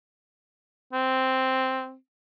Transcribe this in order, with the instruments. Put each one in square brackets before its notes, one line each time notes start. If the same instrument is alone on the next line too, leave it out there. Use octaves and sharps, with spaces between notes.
[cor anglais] C4